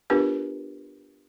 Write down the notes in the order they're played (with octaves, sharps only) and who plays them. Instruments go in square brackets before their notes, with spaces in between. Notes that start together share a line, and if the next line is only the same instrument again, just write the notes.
[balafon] B3 D4 F4 G4 A#4 B4